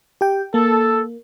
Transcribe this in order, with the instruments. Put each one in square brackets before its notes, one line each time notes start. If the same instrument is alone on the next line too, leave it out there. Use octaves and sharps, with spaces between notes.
[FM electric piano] G4 G5
[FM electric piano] A#3 [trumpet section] A4